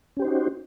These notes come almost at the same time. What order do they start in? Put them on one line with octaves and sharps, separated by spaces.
C#4 G4 C5 D#4 F#4